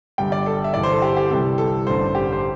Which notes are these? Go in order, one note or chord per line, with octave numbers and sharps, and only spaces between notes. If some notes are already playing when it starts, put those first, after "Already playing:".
G1 G2 G3 G5
D5
A4
E5
G1 G2 E3 D5
C5
A4
G4
G4
C2 C3 E3 G3 A4
A4
A1 G2 D3 G3 C5
G4
C5